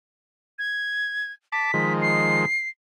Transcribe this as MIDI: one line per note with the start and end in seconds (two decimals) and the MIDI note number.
0.59 1.32 92
1.52 1.71 81
1.52 1.71 86
1.52 1.93 95
1.74 2.45 51
1.74 2.45 53
1.74 2.45 56
2.02 2.69 96